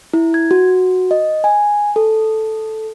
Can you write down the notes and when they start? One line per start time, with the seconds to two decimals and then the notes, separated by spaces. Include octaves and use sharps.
0.14 E4
0.34 G#6
0.51 F#4
1.11 D#5
1.44 G#5
1.96 A4